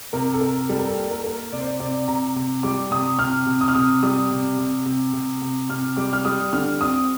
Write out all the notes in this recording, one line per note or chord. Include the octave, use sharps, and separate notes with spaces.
C3 A#4
A4
C3 A#4
G3 A4
A#4
A4
A#3
A#4
A4
A#3 A#4
C3 D5
C5
D5
C3 D5
C3 A#5
C3
G3 D6
C3 D#6
C3 F6
C3
D#6
F6
C3 D#6
G3 D#6
C3
C3
C3
C3
C3
C3 F6
G3 D6
F6
G3 D#6
D3 F6
C4 D#6